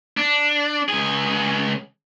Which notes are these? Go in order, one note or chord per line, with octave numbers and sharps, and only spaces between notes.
D4
C#2 G#4